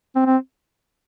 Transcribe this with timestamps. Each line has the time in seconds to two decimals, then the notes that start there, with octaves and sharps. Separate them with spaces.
0.15 C4
0.25 C4